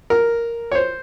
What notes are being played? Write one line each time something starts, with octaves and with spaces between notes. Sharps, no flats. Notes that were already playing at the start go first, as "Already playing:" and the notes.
A#4
C#5
C5